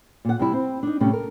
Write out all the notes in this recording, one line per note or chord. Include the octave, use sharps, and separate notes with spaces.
A#2 F#5
C3 G3 E4
C4
D4 D#4
A2 C3 G3 C#4
A4 A#4